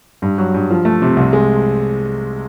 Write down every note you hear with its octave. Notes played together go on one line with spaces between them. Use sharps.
G2
F#3
G2
F3
A3
C3
C2
G#3